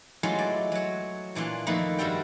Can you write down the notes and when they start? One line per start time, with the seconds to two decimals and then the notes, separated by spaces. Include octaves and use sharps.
0.23 E3 F#3 G#3 A3 C#4 F4
0.39 D5
0.72 F#3 C#5
1.35 A#2 E3 D4 F4
1.67 F2 D#3 A3 A#3 B4
1.98 G2 G3 F#4 A4 G5